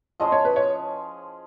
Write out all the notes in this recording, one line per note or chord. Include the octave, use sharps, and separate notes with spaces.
F3 G#3 C#4 G#4 D#5
C#5
B4
C#5